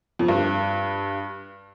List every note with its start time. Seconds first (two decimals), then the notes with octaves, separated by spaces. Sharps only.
0.19 F2
0.28 G2